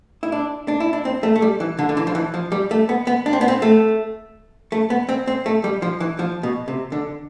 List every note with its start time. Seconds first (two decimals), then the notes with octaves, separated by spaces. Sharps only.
0.23 E4
0.32 D4
0.68 D4
0.80 E4
0.93 D4
1.05 C4
1.23 A3
1.36 A3
1.42 G3
1.60 E3
1.79 D3
1.89 D3
1.97 E3
2.07 F3
2.15 E3
2.34 F3
2.52 G3
2.71 A3
2.89 B3
3.07 B3
3.26 D4
3.33 C4
3.41 B3
3.48 C4
3.62 A3
4.72 A3
4.90 B3
5.09 C4
5.27 C4
5.46 A3
5.64 G3
5.82 F3
6.00 E3
6.19 F3
6.43 B2
6.68 C3
6.92 D3